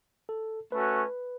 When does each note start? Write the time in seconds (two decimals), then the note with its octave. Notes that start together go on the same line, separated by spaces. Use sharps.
0.29 A4
0.72 A3 C#4 F#4 B4